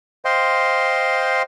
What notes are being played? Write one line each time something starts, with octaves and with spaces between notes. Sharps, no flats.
C5 D#5 F5 G5 C6